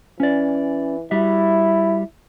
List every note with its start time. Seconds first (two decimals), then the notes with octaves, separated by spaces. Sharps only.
0.20 E3 C#4 D5
1.11 G3 E4 F#4 E5